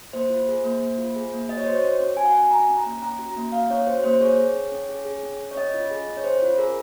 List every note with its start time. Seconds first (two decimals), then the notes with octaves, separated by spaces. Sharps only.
0.13 A#3 C5
0.30 F4
0.48 G#4
0.64 A#3
0.81 A#3
0.98 F4
1.16 G#4
1.33 A#3
1.49 F#4 D#5
1.57 C#5
1.66 F#4 C5
1.75 C#5
1.83 C#4
2.00 C#4
2.17 F#4 G#5
2.25 F#5
2.34 F#4 G#5
2.50 C#4 A#5
2.68 C#4
2.77 A#5
2.85 A#3
3.02 C#4 A#5
3.19 F#4
3.28 A#5
3.36 A#3
3.52 A#3 F5
3.70 C#4 C#5
3.86 F#4 C5
4.04 A#3 C5
4.21 G#4 C#5
4.38 G#4
4.55 C#4
4.72 C#4
4.89 G#4
5.05 G#4
5.23 C#4
5.39 C#4
5.51 C#5
5.56 C#4 D#5
5.74 F4
5.91 G#4
6.08 C#4
6.17 C#5
6.24 C#4 C5
6.42 F4
6.58 G#4 A#4